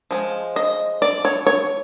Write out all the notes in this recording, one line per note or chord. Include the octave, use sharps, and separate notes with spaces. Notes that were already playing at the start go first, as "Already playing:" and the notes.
F3 G#3
D#5
D5
C#5
C#5